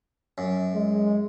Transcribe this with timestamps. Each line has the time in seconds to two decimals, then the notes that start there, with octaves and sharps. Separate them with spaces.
0.38 F#2
0.74 G#3